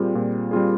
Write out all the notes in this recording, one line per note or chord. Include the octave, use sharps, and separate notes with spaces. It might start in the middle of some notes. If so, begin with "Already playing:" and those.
Already playing: A#2 G3 C4 F4 G#4
A#2
G3 C4 F4 G#4